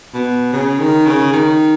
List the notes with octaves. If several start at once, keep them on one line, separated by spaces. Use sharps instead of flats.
B2
C#3
D#3
C#3
D#3